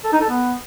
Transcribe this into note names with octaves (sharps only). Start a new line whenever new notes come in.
A4
D#4
A4
B3